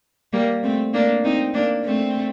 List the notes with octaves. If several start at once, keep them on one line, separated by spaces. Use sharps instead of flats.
G3 A#3
A3 C4
A#3 D4
C4 D#4
A#3 D4
A3 C4